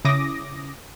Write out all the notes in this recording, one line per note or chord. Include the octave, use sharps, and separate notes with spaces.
C#3 C#4 E4 D6 D#6 A#6